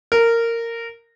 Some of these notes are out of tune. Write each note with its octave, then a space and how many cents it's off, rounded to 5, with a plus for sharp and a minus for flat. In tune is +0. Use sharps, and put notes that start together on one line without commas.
A#4 -15